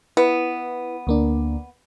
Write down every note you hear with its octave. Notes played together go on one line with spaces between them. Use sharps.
B3 E4 B4
D2 A#3 D4